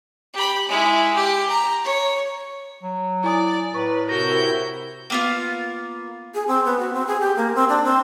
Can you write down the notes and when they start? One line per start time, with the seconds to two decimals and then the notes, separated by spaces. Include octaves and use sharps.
0.34 G4 B5
0.69 G#3 E4
1.15 G4
1.50 A#5
1.84 C#5
2.83 F#3
3.24 E4 D5 G#5 D#6
3.74 A2 B4 A#5 C#6
4.09 C3 E4 F#4 A#4 G6 A#6
5.10 A#3 B3 F4
6.34 G#4
6.48 C4
6.65 B3
6.79 F#4
6.93 C4
7.07 G#4
7.21 G4
7.36 A#3
7.55 C4
7.69 D4
7.84 C4